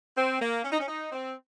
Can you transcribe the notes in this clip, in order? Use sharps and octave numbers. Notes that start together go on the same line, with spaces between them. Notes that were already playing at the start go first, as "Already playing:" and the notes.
C4
A#3
C#4
D#4
C#4
D#4
C4